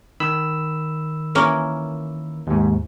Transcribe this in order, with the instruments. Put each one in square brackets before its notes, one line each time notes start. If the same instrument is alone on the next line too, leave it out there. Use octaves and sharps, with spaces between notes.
[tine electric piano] D#3 B5 E6
[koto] E3 A#3 C#4
[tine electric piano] D#2 G#2